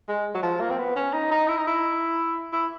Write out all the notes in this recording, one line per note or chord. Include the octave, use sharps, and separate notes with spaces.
G#3
F#3
F3
A#3
C4
B3
C#4
D#4
D#4
E4
D#4
E4
E4